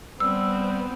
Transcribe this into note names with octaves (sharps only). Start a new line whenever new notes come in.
G3 B3 C4 E6